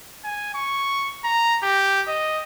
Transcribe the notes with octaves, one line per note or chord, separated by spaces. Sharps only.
G#5
C#6
A#5
G4
D#5